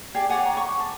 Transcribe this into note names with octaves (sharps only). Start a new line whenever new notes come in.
G4 G#4 D5
C#5 D5 F#5 G#5
A#5
C#6
A5